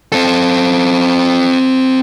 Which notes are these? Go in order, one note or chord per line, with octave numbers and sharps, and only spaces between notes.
C4 A4